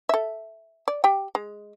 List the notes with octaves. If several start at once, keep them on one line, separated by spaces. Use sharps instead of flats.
A4 E5
D5
G4 G5
G#3